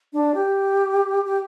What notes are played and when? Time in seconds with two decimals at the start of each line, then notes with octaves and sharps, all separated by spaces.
0.13 D4
0.34 G4
1.25 G4